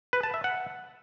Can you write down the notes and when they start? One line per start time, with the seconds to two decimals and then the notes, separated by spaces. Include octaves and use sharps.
0.13 B4
0.23 A5
0.34 E5
0.44 F#5